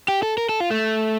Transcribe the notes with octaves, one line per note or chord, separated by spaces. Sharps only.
G4
A4
A#4
A4
F4
A3